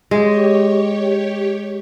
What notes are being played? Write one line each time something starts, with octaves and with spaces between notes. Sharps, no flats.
G#3 G4 C#5